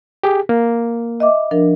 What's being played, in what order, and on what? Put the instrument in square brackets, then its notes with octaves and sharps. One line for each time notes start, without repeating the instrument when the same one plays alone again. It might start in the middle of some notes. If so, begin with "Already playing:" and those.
[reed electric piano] G4 G#4
A#3
[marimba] D#5 E5 D6
F3 D4 A#4